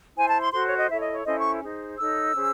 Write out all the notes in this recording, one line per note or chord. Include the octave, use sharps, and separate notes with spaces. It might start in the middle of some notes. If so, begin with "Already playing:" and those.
E4 C5 G#5
A5
C6
F#4 A4 C5 C6
C#5
D#5
E4 A4 C#5 E5
D#5
C#5
C#4 E4 A4 C5 D#5
C#6
D#4 G#4 C5
D#4 A4 C#5 E6
C#4 G#4 C5